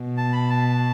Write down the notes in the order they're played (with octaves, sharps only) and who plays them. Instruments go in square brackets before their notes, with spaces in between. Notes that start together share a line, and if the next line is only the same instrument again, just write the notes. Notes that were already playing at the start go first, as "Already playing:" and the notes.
Already playing: [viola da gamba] B2
[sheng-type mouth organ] A5
B5
A5